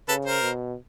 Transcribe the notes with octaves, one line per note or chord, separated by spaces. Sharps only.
C#3 A4 B4
A#4 C5
B2